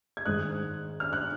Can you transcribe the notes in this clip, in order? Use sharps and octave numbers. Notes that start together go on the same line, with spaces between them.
G#6
G#2 D#3 G#3 D#6 F#6
F6
F#6